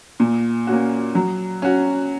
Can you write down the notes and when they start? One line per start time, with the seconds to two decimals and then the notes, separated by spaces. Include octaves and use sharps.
0.20 A#2
0.67 A#3 C#4 F#4
1.15 F#3
1.62 C#4 F#4